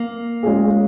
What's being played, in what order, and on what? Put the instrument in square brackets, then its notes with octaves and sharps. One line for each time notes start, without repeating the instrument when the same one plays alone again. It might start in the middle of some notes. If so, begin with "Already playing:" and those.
Already playing: [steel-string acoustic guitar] A#3
[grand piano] G#3 C#4 F4 G#4